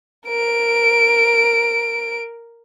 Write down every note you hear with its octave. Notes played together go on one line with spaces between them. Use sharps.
A#4 D7